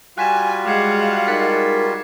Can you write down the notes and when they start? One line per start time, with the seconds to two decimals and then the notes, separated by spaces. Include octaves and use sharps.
0.18 G3 F4 F#4 G#5 F#6 B6 E7
0.66 G#3 F5 F#5 D6 G#6 C7
1.27 G#3 D#4 A#4 A6 B6 C#7